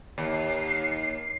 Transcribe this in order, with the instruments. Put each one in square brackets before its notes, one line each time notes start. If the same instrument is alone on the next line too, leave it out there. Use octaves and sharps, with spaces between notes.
[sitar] D#2 [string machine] C7